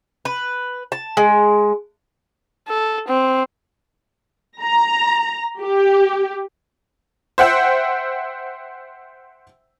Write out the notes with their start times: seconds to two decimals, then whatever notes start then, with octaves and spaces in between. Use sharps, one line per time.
0.25 B4
0.92 A5
1.17 G#3
2.68 A4
3.08 C4
4.61 A#5
5.60 G4
7.38 C5 E5 F#5 G5 E6